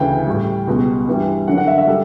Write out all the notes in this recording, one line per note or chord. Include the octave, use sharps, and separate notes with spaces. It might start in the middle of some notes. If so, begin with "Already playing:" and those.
Already playing: D2 C#3 E3 G5
A2 G3
C#2 B2 G3
G2 E3 G3
F#2 D3 F#3 F#5
F#5
E5
E5
G3 A4